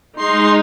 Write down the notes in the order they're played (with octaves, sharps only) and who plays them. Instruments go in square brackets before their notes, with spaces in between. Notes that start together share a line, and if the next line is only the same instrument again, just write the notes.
[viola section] G#3 D#4 C6